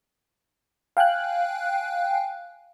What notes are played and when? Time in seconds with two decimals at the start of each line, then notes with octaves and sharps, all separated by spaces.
0.97 F5 G5 G#5 F#6